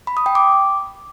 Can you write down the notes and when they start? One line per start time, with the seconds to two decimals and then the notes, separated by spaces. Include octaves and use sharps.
0.07 B5
0.17 D#6
0.26 G5
0.35 D6